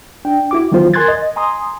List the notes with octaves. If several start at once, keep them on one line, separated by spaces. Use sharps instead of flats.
D4 G5
E4 F#4 D6
D#3 E3 F#3 B3 F4 C5
A#4 G#5 C6 F#6 G#6 A6
D#5
G#5 A#5 C6 D#6